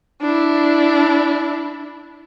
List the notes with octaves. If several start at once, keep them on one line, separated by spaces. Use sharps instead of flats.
D4 E4